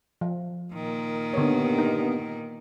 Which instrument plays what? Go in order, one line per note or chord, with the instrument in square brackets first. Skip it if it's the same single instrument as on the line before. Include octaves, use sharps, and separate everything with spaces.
[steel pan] F3
[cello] A#2 D#3
[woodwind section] G2 B3 [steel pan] D3 C#5
[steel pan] D#4 A#4